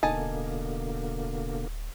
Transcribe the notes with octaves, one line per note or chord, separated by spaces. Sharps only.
D1 B2 D3 A#3 D#4 G#5 A5